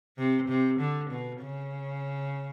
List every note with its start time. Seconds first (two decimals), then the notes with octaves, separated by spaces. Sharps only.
0.18 C3
0.49 C3
0.79 D3
1.10 B2
1.42 C#3